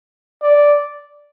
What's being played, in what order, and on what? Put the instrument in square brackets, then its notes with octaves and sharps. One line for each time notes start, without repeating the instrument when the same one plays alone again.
[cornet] D5